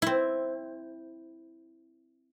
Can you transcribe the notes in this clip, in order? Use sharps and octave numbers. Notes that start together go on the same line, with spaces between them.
C4 E4